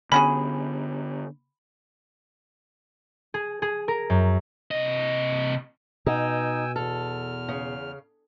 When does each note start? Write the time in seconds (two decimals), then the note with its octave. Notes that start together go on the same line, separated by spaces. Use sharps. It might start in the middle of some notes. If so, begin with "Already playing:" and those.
0.12 D3 B3 C#4 F#4 G#4 B5
3.34 G#4
3.62 G#4
3.88 A#4
4.10 F#2
4.71 C3 D#5
6.06 B2 D#4 G5 G#5 E6
6.76 E2 A4 F6
7.49 C#3